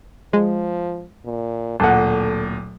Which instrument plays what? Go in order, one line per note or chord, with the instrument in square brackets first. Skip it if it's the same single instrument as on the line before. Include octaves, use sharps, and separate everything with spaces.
[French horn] F3 [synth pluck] G#3
[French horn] A#2
[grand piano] D1 A#2 [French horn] A4 [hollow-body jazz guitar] F#5 G#5 A5